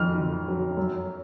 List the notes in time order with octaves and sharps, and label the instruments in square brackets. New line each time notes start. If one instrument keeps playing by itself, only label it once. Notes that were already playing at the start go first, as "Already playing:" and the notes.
Already playing: [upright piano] F2 D#3 F#3 F6
F2
F#3
F#2